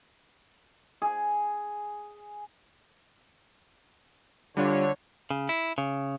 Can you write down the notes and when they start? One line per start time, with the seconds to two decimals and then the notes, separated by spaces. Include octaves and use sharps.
1.02 G#4
4.57 D3 G3 D4 F4 C#5
5.30 C#3
5.49 E4
5.78 C#3